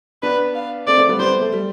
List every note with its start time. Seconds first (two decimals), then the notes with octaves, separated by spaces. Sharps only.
0.22 B3 D4 B4
0.55 F5
0.87 A3 C4 D5
0.98 A3 C4
1.08 G3 B3
1.19 G3 B3 C5
1.30 A3
1.41 A3
1.52 G3